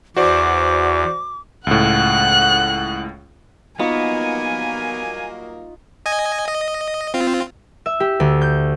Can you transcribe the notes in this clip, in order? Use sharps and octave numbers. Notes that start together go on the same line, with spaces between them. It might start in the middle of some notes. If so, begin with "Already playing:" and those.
E2 F#4 C5 D5 D6
C#2 A2 F#5 F#6
F#3 G3 A#3 B3 D#4 F4 G#5 C#6
D#5 G#5
D#5
C4 F4
E5
G4
D2
G6